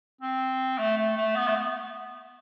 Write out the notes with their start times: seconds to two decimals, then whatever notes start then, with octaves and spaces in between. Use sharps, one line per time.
0.21 C4
0.79 A3
0.98 A3
1.17 A3
1.36 B3
1.48 A3
1.56 B3